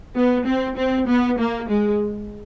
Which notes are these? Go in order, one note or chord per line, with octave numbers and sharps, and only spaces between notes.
B3
C4
C4
B3
A#3
G#3